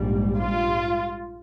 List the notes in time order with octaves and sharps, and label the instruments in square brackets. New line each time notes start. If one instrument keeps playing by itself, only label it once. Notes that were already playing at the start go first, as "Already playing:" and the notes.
Already playing: [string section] A#1 G#2 G3
F4